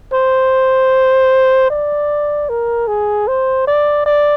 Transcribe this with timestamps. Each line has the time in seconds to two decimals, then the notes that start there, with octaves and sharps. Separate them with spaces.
0.13 C5
1.70 D5
2.49 A#4
2.88 G#4
3.28 C5
3.67 D5
4.06 D5